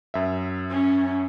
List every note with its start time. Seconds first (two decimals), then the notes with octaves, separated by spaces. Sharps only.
0.14 F#2 E5
0.70 C#4